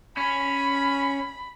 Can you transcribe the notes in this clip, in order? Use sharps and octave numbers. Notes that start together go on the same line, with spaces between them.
C#4 B5